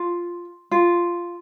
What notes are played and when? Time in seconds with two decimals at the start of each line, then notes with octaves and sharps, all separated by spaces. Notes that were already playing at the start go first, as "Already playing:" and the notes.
Already playing: F4
0.71 F4